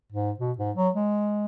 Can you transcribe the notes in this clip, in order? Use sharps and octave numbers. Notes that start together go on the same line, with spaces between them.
G#2
B2
G#2
F#3
G#3